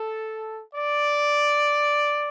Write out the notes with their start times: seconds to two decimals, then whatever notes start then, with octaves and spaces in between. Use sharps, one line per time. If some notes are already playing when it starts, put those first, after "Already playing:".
Already playing: A4
0.75 D5